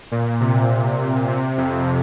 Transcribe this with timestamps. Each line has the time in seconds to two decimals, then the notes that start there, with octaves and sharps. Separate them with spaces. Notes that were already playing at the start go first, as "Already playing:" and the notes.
0.12 A#2
0.41 C3
1.28 C3
1.57 F2